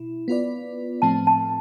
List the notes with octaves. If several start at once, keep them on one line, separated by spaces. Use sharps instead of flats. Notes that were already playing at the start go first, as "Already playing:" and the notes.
Already playing: B2 E4
B3 F4 B4 D5
A2 F3 A3 C4 A5
A5